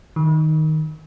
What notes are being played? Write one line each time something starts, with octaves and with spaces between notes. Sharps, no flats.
D#3